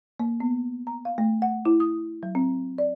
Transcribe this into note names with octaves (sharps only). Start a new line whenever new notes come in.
A#3
B3
A#5
F5
A3
F#5
E4
D#6
F#3
C4
D5